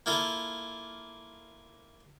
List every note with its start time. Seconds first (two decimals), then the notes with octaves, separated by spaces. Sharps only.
0.06 A#3 E4 F4 A4